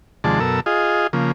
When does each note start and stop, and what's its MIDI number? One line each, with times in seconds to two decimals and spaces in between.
0.24 0.40 39
0.24 0.40 48
0.24 0.40 53
0.24 0.40 56
0.24 0.40 74
0.24 0.40 81
0.40 0.60 42
0.40 0.60 47
0.40 0.60 69
0.40 0.60 70
0.40 0.60 88
0.66 1.07 65
0.66 1.07 68
0.66 1.07 75
1.13 1.32 49
1.13 1.32 53
1.13 1.32 58